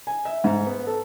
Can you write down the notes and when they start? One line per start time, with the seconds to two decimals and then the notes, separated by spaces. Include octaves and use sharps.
0.07 G#5
0.25 E5
0.44 G#2
0.66 B3
0.87 A4